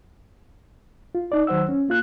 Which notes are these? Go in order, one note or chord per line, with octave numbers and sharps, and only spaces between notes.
F4
D#4 D5
D#3 F#3 C5 F#5 E6
C#4
A#3 F4 F#6